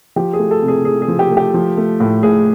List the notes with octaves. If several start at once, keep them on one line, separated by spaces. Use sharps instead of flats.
F3 G4
G#4
A3
A4
C3
G#4
C3 G#4
G#4
F3
G4
A3
G4
F3
A3
A2
A2 G#4